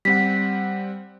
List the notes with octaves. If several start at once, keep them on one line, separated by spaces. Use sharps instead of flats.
G3 C4 F#5 B6